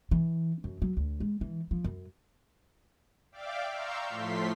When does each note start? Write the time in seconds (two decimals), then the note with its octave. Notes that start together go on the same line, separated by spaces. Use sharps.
0.11 E3
0.64 F#2
0.82 F#3
0.97 D2
1.20 G#3
1.41 E3
1.71 F3
1.84 F#2
3.32 D5 E5 F5 G5 D6
3.73 F5 A#5 C6 C#6 E6 G6
4.09 A2 F3 A3 C6 B6